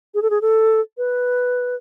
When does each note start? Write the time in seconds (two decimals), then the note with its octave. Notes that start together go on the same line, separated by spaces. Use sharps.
0.14 G#4
0.22 A4
0.30 G#4
0.42 A4
0.98 B4